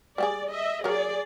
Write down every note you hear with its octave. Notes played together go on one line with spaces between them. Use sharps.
G3 G4 G#4 D5
D#5 E5
F#3 G#4 A#4 D5